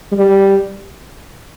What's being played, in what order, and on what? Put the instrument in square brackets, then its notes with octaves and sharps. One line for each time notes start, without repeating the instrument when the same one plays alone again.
[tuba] G3